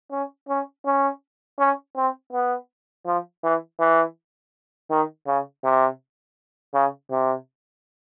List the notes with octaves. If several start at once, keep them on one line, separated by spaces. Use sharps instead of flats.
C#4
C#4
C#4
C#4
C4
B3
F3
E3
E3
D#3
C#3
C3
C#3
C3